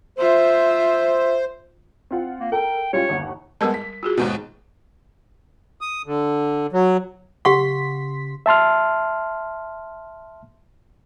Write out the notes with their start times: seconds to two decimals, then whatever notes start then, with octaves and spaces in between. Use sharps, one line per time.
0.18 F4 C5 E5
2.11 C4 F4 F#5
2.40 A#3
2.52 A4 A#4 G5
2.93 G3 C#4 F4 C#5
3.09 G1 D#2 F#5
3.61 G3 G#3 B3 A#4 A5
3.74 B6
4.03 F4 F#4 G#4
4.18 D#2 G#2 B2
5.81 D#6
6.06 D3
6.73 F#3
7.45 C#3 G4 F#5 C6 C#6 B6
8.46 E5 A5 C6 F6